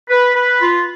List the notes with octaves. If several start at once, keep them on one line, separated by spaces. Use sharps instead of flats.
B4
B4
F4